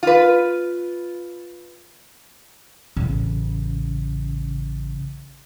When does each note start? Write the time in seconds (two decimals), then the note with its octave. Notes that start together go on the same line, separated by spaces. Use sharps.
0.03 F4 B4
2.96 A1 C#3